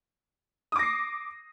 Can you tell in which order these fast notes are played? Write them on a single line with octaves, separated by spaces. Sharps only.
D#6 D6 A#6 C7